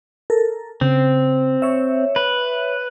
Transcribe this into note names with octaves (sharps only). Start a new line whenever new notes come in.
A4 A#4
C#3 C4
C#5 E5
B4